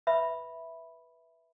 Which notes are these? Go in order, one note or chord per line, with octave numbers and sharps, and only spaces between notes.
B4 E5 B5